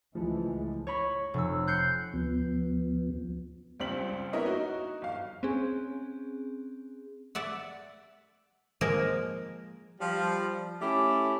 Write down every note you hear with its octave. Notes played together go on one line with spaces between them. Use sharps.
C#2 E3 F3 G#3 A3 E4
C#5 D#5 B5 C#6
F1 E6
F#6 G6 C7 C#7
D2 F3 B3
C#2 G3 C4 C5 B6 F#7
B3 E4 A#4 C#5 D#5 E5
D#4 F#4
G1 F5
C4 C#4 G#4
D5 E5 F#5
F3 G#3 A#3 A#4
F3 G3
A3 C#4 E4 G4